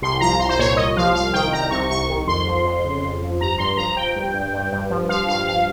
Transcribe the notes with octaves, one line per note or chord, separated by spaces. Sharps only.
C2 C6
F3 A#5
C2 C6
C5
A#2 C#5
C2 D#5
F3 F5
C2 F5
D#3 G5
C2 A#5
C3 C#6
C2 C#6
D#3
F2 C6
F3
F2
C#3
F2
F3
G2 A#5
G2 C6
F3 A#5
F3 G5
G2
G2
G2
G2
F3
F3 F5
G2 F5
G2 F5